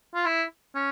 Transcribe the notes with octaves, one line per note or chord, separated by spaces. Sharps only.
F4
E4
C#4